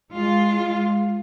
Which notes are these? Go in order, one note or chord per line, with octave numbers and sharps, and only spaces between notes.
G#3 F4